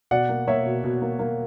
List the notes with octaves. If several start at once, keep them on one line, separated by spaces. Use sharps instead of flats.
B2 D5 F#5
A#3
A#3 C#5 E5
B2
B2
A#3
A#3